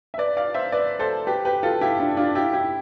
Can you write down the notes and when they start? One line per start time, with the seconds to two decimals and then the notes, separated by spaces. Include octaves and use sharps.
0.14 E5
0.18 B4 D5
0.37 D5 F5
0.54 C5 E5
0.72 B4 D5
0.99 A4 C5
1.27 G4 B4
1.45 G4 B4
1.63 F4 A4
1.81 E4 G4
1.99 D4 F4
2.17 D4 F4
2.35 E4 G4
2.53 E4 G4